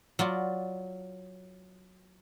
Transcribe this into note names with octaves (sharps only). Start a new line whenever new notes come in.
F#3 F4 D5